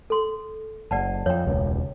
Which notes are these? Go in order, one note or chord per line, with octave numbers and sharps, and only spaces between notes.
A4 C6
F#1 D5 F#5 A5
F2 C#5 G5
E1 C#2